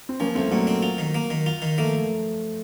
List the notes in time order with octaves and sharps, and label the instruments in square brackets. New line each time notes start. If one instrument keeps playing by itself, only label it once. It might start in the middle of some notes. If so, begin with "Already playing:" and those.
[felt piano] C4
[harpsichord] F3 [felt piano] A#3 C#4
[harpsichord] C2 [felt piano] A3 C4
[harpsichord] A#2 [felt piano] F#3 A#3
[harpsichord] C4
F4
D#3
A#3
D#3
F4
D#3
[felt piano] F3 A3 [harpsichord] A#3